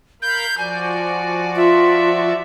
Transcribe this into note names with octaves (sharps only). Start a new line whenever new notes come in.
A#4 F5 B5 G6
F3 F#4 D5 G#5
F4 E5